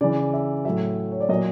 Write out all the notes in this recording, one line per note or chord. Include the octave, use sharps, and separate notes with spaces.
C#3 E3 D5
E5
A2 F#3 E5
C#5
D5
A#2 F#3 D#5